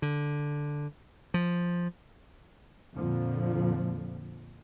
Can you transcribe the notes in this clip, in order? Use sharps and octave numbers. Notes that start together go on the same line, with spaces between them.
D3
F3
F2 A#2 D3 F3